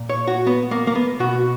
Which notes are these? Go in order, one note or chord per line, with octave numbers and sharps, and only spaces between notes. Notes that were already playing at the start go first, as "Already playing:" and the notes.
Already playing: A#2
C#5
F#4
B3
A#3
A#3
B3
B2 F#4